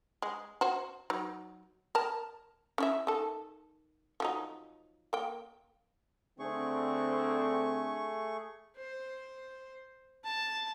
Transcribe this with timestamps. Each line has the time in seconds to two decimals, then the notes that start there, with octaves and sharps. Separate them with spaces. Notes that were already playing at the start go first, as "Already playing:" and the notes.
0.22 G#3
0.61 F#4 C5
1.10 F#3 D#4
1.95 A#4 A5
2.78 C#4 E4 E5
3.07 D#3 A4
4.20 F3 F#3 D#4
5.13 A#3 G5
6.39 D3 A3 C4 G#4 C#6
8.76 C5
10.24 A5